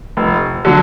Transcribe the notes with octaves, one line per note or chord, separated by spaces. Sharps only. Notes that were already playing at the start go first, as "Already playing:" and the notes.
F1
D3 F#3